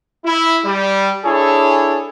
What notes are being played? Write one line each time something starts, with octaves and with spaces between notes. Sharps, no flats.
E4
G3
D4 E4 G#4 A4 C#5